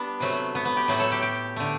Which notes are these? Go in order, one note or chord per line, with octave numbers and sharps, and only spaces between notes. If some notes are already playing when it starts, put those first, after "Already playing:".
Already playing: G3 B3 D4
C3 F#3 A3
B3
B3
G4
A2 F#3 A3
A4
G4
G4
D3 A3